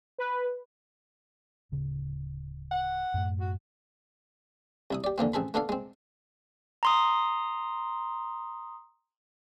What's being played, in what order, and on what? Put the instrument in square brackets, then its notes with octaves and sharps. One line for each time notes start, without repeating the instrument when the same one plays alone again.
[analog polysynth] B4
[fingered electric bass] D1 C#3
[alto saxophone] F#5
[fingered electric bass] F#2 A2 A3
[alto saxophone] F#4
[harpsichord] C2 E4 D#6
G4 D5
D3 E3 A#3 C4
A1 C4 G#4 A4 B5
A3 B3 D4 A4 F5
G#3 C4
[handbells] A#5 C6 D#6